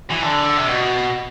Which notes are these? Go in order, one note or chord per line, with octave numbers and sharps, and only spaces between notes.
E3
D3
C3
B2